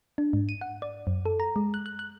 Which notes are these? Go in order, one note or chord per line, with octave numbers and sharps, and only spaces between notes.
D4
G#2
D#7
F#5
D5
F#2
A4
A#5
G#3
F#6
F#6
F#6